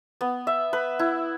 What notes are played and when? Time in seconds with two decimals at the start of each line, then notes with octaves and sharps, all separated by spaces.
0.21 B3
0.47 E5
0.73 B4
0.99 E4